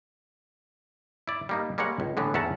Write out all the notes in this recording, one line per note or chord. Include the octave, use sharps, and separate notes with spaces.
E4 D5
G3 A#3 D#4
G3 G#3 A#3 A#4 C#5 F#5
C#2
A2 D3 E3 B3
E2 C#4 E5 F#5 A5 A#5